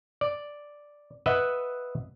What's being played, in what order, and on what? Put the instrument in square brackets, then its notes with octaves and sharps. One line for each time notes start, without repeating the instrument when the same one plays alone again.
[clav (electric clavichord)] D5
B4 D#5 E5 F#5